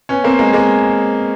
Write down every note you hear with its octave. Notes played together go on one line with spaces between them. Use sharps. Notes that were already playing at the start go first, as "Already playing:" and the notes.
B3 C#4
A#3 C4
G#3 A#3
G#3 A#3